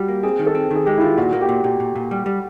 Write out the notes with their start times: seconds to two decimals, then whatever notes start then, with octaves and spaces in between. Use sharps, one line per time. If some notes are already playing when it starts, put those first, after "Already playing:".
Already playing: G3 F#4 G4
0.08 A#3
0.23 C4 G#4
0.39 D#3
0.46 A4
0.55 C4
0.71 D#3 G#4
0.85 G#3 G4
0.98 E4
1.01 D#3 F4
1.17 A#2 F#4
1.33 A#3
1.41 G4
1.49 A#2
1.64 A#2 G4
1.80 A#2
1.96 A#2
2.11 G3
2.26 G3